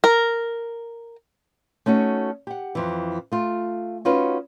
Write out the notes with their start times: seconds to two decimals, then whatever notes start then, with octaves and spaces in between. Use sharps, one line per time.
0.04 A#4
1.86 A3 C#4 D#4 F#4
2.47 G4 F#5
2.75 F2 E3
3.32 A3 F4
4.05 C#4 D#4 F4 F#4 B4